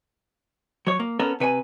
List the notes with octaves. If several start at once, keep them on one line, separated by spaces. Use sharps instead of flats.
F#3 C#5
A#3
B3 C#4 A4 A#4
C3 B4 C#5 G#5